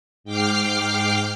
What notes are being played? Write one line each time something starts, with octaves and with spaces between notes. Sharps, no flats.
G#2 G5 D6 F6 C7